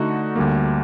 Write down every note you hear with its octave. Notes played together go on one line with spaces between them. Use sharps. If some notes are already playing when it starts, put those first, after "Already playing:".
Already playing: D3 A3 D#4 F#4
D2 D3 G3 A#3